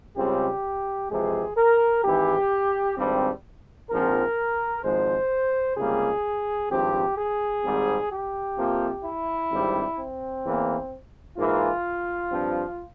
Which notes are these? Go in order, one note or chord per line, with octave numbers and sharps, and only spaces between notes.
C#2 C#3 G3 C4 G4
F2 C3 E3 G#3 G#4
A#4
G#1 G#2 E3 G4
G#1 G2 G3 C4
A#1 G#2 F3 C4 A#4
G#1 G#2 F3 G#3 C5
C#2 C3 G3 A#3 G#4
G#1 G2 F3 C4 G4
G#4
G#1 G#2 G3 C4
G4
F2 C3 F3 A#3
E4
G#1 G2 G3 C4
C4
E2 E3 A#3
G#2 E3 A#3 F4
G2 F3 C4